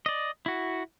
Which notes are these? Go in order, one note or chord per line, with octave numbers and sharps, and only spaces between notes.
D5 D#5
E4 F#4